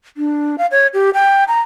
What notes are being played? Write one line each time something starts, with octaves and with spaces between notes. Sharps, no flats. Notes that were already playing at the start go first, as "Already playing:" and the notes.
D4
F5
C#5
G4
G5
A#5